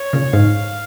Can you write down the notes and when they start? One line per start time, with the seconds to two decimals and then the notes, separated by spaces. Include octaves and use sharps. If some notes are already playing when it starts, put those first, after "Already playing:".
Already playing: C#5
0.13 A#2 C#3
0.33 G#2 F5